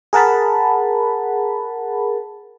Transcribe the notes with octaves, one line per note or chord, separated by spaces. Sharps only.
G#4 A#4 F#5 A5 B5